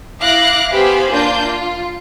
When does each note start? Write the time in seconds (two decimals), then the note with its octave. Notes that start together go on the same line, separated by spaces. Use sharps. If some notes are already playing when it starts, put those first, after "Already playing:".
0.21 E4 F5 D6 F#6 A#6
0.72 B3 G4 C5 F5 G#5 B5
1.11 A#3 D4 F4 G6
1.46 F4